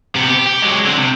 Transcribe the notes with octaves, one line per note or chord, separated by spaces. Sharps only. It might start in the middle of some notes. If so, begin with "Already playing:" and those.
C3 B3
G4
G4
F#3 G#3
D3 C4
C3